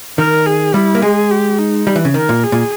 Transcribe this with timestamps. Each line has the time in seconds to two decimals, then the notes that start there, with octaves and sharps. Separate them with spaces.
0.18 D#3 A#4
0.46 G#4
0.74 G3 E4
0.95 A#3
1.02 G#3 G#4
1.31 G4
1.58 D#4
1.87 G3
1.96 E3
2.05 C#3
2.14 D#3 A#4
2.29 A#2
2.43 G#4
2.52 A#2